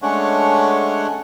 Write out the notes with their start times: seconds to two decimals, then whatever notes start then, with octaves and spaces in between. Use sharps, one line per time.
0.02 G#3 A3 C#4 D4 C#5 F#5